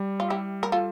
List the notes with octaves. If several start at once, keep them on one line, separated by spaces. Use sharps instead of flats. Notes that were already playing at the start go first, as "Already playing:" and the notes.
Already playing: G3
F4
E4 G4
A#4
F4 A4